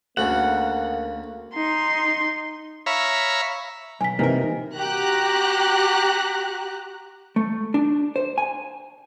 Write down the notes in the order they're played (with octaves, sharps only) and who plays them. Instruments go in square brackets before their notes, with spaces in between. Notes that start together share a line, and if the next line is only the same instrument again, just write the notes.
[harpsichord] D2 C#3 [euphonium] A#3 [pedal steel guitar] F#5
[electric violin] D#4 C6
[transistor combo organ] C#5 E5 F5 A#5 B5
[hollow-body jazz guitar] B1 [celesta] G#5 B6
[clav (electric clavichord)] C3 E3 [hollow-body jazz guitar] A#3 A#4 [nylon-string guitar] D#4
[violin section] F#4 G4 A#5 F#6
[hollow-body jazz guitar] A3
D4
C5
G#5